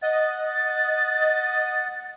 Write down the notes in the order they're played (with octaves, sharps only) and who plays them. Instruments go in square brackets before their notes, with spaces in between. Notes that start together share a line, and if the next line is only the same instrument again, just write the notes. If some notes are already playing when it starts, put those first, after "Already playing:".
[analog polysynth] D#5 [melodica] F#5 [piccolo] A6